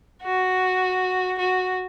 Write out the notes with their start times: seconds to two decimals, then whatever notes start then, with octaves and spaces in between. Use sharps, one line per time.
0.23 F#4
1.39 F#4